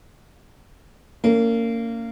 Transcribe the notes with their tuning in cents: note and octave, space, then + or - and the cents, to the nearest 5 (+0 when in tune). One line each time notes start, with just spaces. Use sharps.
A#3 -25 C#4 +35